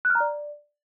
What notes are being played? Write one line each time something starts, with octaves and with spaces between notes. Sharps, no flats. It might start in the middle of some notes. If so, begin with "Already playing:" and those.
F#6
F6
A#5
D5